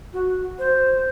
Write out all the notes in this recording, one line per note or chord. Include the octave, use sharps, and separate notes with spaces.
F#4
C5